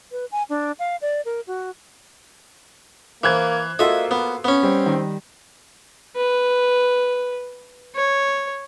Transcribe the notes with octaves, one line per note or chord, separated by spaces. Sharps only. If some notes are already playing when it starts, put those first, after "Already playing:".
B4
G#5
D4
F5
D5
A#4
F#4
E3 A#3 C5 F#6 G#6
A#3 F4 F#4 A4 D#5 E5
B3
B3 C#4
G3 C4
D#3
B4
C#5